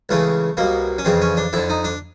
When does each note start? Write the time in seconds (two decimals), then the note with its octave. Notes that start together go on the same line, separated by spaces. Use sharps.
0.09 C#2 C#3 E3 A3
0.57 C2 B2 A#3
0.98 C#4
1.05 F2 C#3 E3 C4
1.22 C#4
1.37 D4
1.53 F2 D3 E4
1.70 D#4
1.84 D4